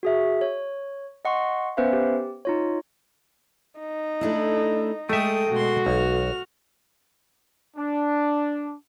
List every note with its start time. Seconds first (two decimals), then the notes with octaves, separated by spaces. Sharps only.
0.03 F#4 G#4 E5
0.41 C#5
1.25 D#5 F#5 C6 C#6
1.77 B3 C#4 B4 C5 E5 F5
1.93 G4
2.45 D#4 F4 C#5
3.80 D#4
4.21 A3 D4 E4
5.09 G#3 A3 A4 E5 G5 D#6
5.51 B2 G#3 F#4 C6
5.87 B1 F6
7.77 D4